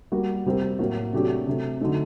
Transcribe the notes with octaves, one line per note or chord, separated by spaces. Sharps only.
G3 A#3 F#4 A#4
C3 G3 C4 G4 A#4
A2 F#3 A#3 F#4
C3 F#3 A3 D4 G4
C3 F#3 A3
D3 F#3 A3 D#4